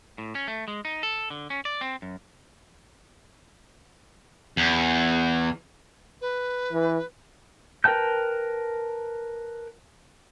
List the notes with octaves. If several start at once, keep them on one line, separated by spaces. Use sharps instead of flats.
A2
C#4
A3
G#3
D#4
A4
D3
C#4
D5
C4
F#2
E2
B4
E3
A#4 B4 G5 A5 G6